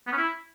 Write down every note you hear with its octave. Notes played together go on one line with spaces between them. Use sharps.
B3
C#4
E4